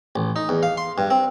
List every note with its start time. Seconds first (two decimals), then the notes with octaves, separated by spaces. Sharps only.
0.16 A1
0.36 D#4
0.49 E2
0.63 F5
0.77 C6
0.98 G2
1.10 C4